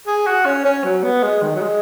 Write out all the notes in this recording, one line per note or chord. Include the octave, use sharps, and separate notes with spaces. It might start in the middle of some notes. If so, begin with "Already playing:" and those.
G#4
F#4
C#4
C#4
F#3
B3
G#3
D#3
F#3
G#3